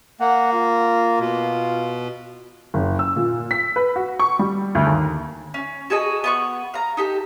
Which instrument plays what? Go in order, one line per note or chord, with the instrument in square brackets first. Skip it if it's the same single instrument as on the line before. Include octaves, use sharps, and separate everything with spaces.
[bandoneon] A#3 [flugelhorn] F#5
[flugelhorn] F4
[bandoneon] B2
[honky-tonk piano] F#1
E6
A#2
B6
B4
F#4
C#6
G3
D2
D#2
[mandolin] C#4
F#4 G#4 A4 D#5
B3 F#5 C#6
F5 A#5
D#4 G4 A4